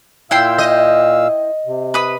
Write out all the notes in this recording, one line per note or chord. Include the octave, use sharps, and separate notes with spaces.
A#2 E4 F5 G5 C6 E6
D#5
C3
B4 D#6